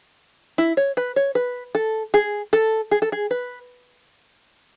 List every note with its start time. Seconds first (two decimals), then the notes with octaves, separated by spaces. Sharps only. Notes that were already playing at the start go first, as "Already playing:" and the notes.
0.58 E4
0.77 C#5
0.97 B4
1.16 C#5
1.35 B4
1.75 A4
2.14 G#4
2.53 A4
2.91 G#4
3.02 A4
3.12 G#4
3.31 B4